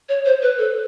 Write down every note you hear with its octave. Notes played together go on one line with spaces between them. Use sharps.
C#5
C5
B4
A4